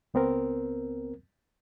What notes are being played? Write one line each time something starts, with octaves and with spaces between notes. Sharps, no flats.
C#2 B3 C4 A#4